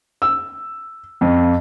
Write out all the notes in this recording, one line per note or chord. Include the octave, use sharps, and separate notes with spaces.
E6
F2